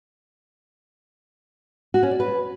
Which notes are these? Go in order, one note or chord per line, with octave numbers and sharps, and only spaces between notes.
F#4
C#4
D5
B4